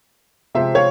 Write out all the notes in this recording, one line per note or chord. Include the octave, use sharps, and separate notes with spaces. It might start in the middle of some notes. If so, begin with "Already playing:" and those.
C3 F3 G#3 C4 C5 E5
C#5 F5